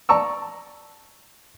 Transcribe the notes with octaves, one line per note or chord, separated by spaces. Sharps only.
D5 A5 A#5 C#6 E6